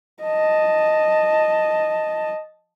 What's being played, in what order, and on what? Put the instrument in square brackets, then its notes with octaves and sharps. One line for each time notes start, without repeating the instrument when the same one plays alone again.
[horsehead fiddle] D#5 A5